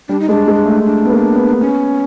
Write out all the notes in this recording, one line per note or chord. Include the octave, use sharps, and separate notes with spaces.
G3 D4
D#4
G#3 D4
G#3
A3
D4
B3
A#3
B3
B3 C#4